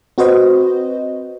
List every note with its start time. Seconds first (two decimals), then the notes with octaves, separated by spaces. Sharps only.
0.18 C4 F#4 B4 C5 D#5